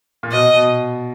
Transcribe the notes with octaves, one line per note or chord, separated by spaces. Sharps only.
A#2
B2 D#5
B2